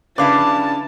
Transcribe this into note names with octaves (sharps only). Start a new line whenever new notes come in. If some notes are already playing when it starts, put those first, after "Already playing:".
C#3 D4 E4 B4 F5 A5 D6